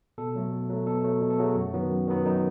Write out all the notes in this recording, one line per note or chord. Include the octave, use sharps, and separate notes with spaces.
B2 A4
F#3 A3
B2
F#3 A3
B2 A4
F#3 A3
B2
A4
F#3 A3 G#4
F#4
F#2
D#3 F#3 B3
F#2
D#3 F#3 B3
F#2 D#4